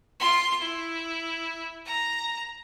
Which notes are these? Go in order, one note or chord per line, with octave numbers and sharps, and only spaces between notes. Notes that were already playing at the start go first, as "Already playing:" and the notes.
F4 C6
E4
A#5